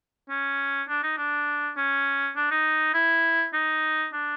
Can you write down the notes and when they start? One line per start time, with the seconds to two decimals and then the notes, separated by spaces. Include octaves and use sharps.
0.29 C#4
0.89 D4
1.03 D#4
1.18 D4
1.77 C#4
2.36 D4
2.51 D#4
2.94 E4
3.54 D#4
4.13 D4